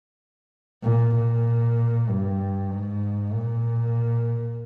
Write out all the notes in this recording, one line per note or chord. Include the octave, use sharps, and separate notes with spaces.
A#2
A#2
G2
G#2
A#2